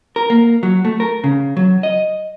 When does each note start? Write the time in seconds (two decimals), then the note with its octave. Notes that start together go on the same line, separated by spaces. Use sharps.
0.16 A#4
0.30 A#3
0.63 F#3
0.85 A3
1.00 A#4
1.24 C#3
1.57 F#3
1.83 D#5